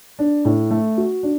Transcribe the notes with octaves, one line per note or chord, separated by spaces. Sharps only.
D4
A2
A3
F#4
D4